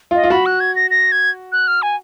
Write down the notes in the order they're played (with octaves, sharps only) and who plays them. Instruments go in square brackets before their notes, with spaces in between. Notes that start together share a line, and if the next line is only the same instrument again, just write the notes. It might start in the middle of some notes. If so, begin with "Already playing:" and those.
[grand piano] F4
[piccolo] D#5
[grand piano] F4
[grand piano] F#4 [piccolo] B5
[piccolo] F#6
G#6
A#6
A#6
G#6
F#6
F6
G#5